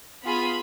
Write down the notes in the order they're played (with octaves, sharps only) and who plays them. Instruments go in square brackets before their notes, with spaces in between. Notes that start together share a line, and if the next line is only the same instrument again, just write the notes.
[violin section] B3 F4 G#4 B5